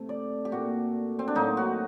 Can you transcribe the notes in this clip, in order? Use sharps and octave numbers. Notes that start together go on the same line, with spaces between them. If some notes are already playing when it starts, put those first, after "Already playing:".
Already playing: C3 A3
D5
G4
A#2 A3 F#4
C4
D4
A2 F#3 A#3 D#4
F#4